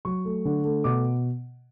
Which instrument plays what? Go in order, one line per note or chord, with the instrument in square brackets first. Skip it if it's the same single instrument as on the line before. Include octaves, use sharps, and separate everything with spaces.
[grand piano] F#3 C#6
A3
D3
A3
B2 D6